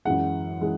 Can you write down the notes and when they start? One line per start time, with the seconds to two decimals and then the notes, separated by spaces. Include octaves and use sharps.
0.05 F#2 E3 G#3 F#5
0.61 E3 G#3